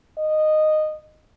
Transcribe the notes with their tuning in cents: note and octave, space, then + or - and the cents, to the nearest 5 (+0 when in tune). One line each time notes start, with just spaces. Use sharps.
D#5 -10